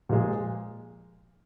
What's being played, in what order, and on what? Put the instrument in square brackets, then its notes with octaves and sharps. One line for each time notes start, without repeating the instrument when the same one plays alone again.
[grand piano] A#2 F3 G#3